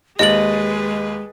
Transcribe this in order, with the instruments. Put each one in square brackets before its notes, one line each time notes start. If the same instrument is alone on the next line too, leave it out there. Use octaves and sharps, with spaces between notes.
[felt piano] D#2 A6 [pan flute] G#3 [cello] G#4 B4 [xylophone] D#5 F#7